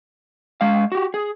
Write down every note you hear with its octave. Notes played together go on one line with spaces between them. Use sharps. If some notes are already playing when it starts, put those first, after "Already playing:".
G#3 F5
F#4 G4
G#4